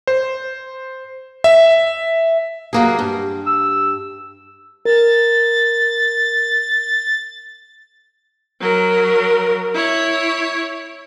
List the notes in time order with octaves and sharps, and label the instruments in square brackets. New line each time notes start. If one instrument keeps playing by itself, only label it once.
[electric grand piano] C5
E5
[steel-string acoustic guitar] F#3 A#3 G#4
G2
[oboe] E6
[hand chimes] A#4 [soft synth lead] A6
[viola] F#3 A#4
E4 C#5